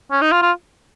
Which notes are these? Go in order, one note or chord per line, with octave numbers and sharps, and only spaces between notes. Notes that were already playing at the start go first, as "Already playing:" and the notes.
C#4
D#4
F4
F4